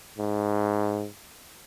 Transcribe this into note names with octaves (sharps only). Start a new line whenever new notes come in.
G#2